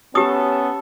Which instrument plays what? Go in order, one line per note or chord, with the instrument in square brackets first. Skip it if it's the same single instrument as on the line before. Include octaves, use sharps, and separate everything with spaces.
[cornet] B3 [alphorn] C#4 [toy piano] G4 D#6 [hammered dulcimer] A4